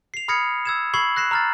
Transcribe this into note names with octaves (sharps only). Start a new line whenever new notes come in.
C7 F7
B5 D#6 F6 G#6 A#6 C#7
E6 G#6 E7
B5 C#6 E6 G#6 C7 F#7
F#6 A#6 C7 E7
A#5 F6 A6